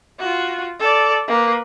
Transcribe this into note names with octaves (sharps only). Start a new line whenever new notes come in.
F4 F#4
A4 D5
A#3 B4